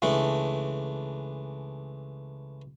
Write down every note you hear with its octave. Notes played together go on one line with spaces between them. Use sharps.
C#2 E3 A3 D4